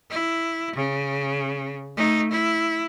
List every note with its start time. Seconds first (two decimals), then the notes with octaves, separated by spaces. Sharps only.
0.10 E4
0.75 C#3
1.97 A3 D#4
2.31 E4